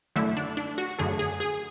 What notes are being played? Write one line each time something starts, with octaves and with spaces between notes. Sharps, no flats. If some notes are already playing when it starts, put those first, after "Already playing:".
F#2 D3 A3 E4
D4
D4
F#4
F#2 D3 A3 G#4
G#4
G#4